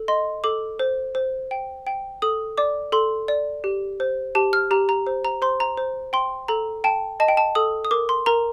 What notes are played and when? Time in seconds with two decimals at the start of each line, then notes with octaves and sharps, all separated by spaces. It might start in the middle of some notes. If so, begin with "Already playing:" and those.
Already playing: A4
0.08 D#5 C6
0.44 A4 D6
0.79 C5
1.15 C5
1.51 G5
1.87 G5
2.22 A4 D#6
2.58 D5 D6
2.92 A4 C6
3.28 D5
3.64 G4
4.00 C5
4.35 G4 A5
4.53 F6
4.71 G4 A#5
4.89 A#5
5.07 C5
5.25 A#5
5.42 C5 C6
5.60 A#5
5.77 C5
6.13 G5 C6
6.48 A4 A#5
6.84 G5 A5
7.20 D#5 A5
7.28 G5
7.37 A5
7.55 A4 D#6
7.85 D#6
7.91 A#4 D6
8.09 C6
8.26 A#4 A#5